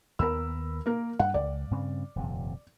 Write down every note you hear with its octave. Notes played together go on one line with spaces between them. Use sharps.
D#2 B3 A#4 B5 E6
A#3 A#4
G2 F#5
C#2 D5
G2 C#3 C4
D#1 F2 C3